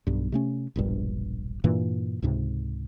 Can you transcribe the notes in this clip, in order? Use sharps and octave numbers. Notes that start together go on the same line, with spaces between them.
B1 G2
C3 A3 C#4
E1 A#1 G2
G2 A#2 E3 A#3
C#2 G#2 C3